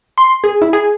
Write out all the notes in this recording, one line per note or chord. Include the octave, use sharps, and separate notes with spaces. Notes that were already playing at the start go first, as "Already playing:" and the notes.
C6
G#4
E4
G#4